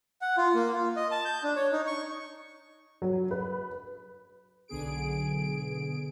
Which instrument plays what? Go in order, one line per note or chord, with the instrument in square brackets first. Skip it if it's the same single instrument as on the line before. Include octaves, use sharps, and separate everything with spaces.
[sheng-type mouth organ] F#5
F4
A#3
F4
D#5
A5
G6
D4
C#5
D#4
C#6
[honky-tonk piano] F#3
B4
[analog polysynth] B1 D3 B3 G#4 D7